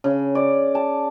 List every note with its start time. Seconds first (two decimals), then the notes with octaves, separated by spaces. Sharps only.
0.04 C#3
0.35 D5
0.75 A5